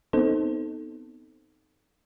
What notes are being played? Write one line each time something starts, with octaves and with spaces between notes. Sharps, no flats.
B3 C4 D#4 A4 C5